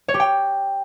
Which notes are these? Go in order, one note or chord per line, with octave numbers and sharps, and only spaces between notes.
C#5
G4
G5